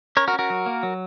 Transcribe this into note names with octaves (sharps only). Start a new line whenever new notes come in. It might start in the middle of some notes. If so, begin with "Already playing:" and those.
C#4 A#4 C#5
F#4 A#4
C#4
F#4 A#4
F#3
A#3
F#3